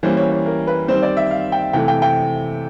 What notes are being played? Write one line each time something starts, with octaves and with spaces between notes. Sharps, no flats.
E3 G3 A#3 C#4 C5
C#5
C#5
A#4
B4
D#3 G3 C4 C5
D5
E5
F5
G5
C3 E3 A3 G5
G5
G5